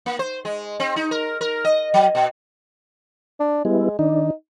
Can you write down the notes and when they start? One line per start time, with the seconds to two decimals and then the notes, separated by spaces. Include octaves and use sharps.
0.06 A#3
0.19 C5
0.45 G#3
0.80 C4
0.96 D#4
1.11 A#4
1.41 A#4
1.65 D#5
1.94 F#3
2.15 B2
3.40 D4
3.65 G3 G#3 B3 E4
3.99 D#3 D4 D#4